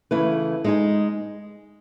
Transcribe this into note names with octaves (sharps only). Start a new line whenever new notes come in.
C#3 E3 A3 E4 B4
G#3 D#4 G#4